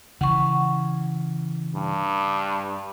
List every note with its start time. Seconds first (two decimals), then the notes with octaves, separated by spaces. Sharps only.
0.21 C#3 E3 F#5 C#6
1.75 G2